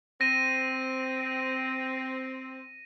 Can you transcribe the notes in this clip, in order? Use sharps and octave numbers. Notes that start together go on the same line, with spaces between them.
C4 A#6 D#7